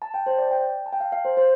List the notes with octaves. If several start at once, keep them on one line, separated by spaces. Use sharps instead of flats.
A5
G5
C5
D5
G5
A5
G5
F5
F5
C5
C5